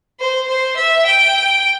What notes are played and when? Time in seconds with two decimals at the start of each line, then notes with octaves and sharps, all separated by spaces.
0.20 C5
0.48 C5
0.77 E5
1.06 G5